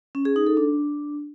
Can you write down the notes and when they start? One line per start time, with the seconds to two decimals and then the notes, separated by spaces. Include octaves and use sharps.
0.15 C#4
0.25 G#4
0.36 D#4
0.47 A4
0.57 D4